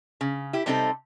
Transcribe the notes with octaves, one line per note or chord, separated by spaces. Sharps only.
C#3
E4 G4
C3 G3 C4 D#4 F#4 A4